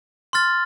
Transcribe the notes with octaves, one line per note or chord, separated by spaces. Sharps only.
C6 F6 A6